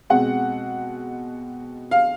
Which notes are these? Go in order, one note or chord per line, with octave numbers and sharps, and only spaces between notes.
B2 G#3 C4 F#5
F5